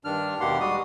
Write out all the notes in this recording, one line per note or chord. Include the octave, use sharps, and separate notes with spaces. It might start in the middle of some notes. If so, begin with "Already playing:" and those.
G2 D#3 D4 F6
D#2 B2 A#3 G4 F#5 C6
G3 G#3 F#4 D#6